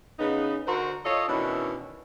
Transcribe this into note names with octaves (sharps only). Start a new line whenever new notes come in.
C#3 B3 D#4
D3 F#4 A#4 C5
F4 A4 C#5 D#5
B2 D#3 E3 C#4 D4 E4